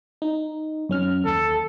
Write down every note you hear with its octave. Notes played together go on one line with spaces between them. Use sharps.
D#4
F#2 C#4 F6
D#2 A4